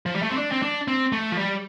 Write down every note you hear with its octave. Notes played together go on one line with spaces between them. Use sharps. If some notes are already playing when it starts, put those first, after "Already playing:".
F3
G3
A3
C4
D4
C4
D4
C4
A3
F3
G3